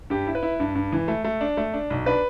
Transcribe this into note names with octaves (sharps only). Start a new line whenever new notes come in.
G2 G4
E4
B4
E4
G2
G2
E3
A3
A3
D4
A3
D4
B1
D4 B4